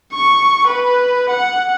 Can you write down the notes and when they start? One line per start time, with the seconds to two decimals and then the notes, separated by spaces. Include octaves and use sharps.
0.12 C#6
0.68 B4
1.30 F#5